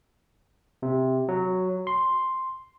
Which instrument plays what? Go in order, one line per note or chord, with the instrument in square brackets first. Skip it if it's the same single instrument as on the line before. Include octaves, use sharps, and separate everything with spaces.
[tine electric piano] C3
F#3
C6